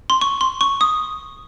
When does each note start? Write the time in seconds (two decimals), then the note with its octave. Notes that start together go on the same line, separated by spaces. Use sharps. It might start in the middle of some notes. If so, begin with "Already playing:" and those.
0.10 C6
0.21 C#6
0.41 C6
0.61 C#6
0.81 D#6